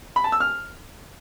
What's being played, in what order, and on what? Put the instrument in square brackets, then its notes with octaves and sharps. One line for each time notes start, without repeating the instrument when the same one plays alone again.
[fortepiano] B5
A5
E6
F6